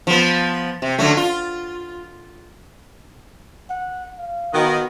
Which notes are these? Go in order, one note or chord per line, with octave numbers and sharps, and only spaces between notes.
F3 B3
C3
D3 F#3 A3
F4
F#5
F5
D#3 B3 F#4 B4 D#5 F#5